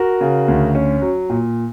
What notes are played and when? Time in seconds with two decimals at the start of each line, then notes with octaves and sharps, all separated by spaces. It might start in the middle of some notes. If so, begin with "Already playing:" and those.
Already playing: F#4 A#4
0.21 C#3
0.48 D2
0.75 C#4
1.02 F#3
1.30 A#2